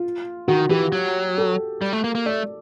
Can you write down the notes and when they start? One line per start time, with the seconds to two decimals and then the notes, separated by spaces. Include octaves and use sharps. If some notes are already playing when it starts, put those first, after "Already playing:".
Already playing: F4
0.48 D#3 F#4
0.70 E3 G4
0.92 F#3
1.38 A4
1.82 G3
1.93 A3
2.04 A#3
2.15 A#3
2.26 A3 D5